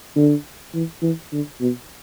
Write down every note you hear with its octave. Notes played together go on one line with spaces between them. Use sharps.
D3
E3
E3
D3
B2